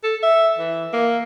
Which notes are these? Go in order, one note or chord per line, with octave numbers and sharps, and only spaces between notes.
A4
E5
E3
A#3